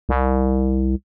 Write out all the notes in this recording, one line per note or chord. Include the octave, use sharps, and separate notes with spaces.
C2